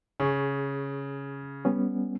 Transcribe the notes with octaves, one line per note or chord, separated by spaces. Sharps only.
C#3 G#4 C#6
G3 B3 C#4